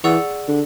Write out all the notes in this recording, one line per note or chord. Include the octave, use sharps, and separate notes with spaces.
E3 G#4 D5 F#5 C#6 E6
D3